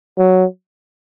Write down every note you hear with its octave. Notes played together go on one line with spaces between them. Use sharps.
F#3